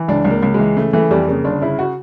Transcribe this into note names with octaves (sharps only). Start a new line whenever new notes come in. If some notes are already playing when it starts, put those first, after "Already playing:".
Already playing: E3
C#2 D4
C#2
A#3
C#2
E3 G#3
C#3 A3
E3 A3
F2 G3
C#3 A#3
G1 D4
C#3 E4
F#4